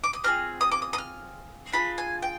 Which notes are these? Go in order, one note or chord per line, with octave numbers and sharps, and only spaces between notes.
D6
D#6
C4 F4 G#4 F6
D#6
D6
D#6
D#6
F6
D4 F4 G#4 B5
G#5
G5